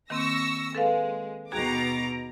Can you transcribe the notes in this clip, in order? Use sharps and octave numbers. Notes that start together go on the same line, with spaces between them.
D#3 A#3 C4 C#6 E6 A#6
G#3 A4 B4 F5
D#2 B2 F#4 G#4 A#5 D6